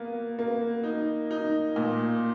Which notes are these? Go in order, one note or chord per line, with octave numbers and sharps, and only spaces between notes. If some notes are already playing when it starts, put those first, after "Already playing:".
Already playing: A#3 B3
A#3
D#4
D#4
A#2